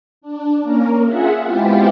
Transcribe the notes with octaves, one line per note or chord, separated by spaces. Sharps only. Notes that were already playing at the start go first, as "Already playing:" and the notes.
D4
A#3 C#4 A#4
F4 G#4 E5 F#5
G#3 B3 C4 E4 F4 G4